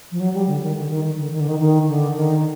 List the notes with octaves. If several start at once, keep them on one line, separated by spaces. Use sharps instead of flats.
F3
F#3
G3
D3
D#3
D3
D#3
D3
D#3
D3
D#3
D#3
D3
D#3